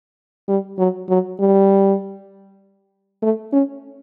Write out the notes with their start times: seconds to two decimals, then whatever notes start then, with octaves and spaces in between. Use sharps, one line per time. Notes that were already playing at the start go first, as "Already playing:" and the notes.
0.49 G3
0.79 F#3
1.09 F#3
1.40 G3
3.22 A3
3.53 C#4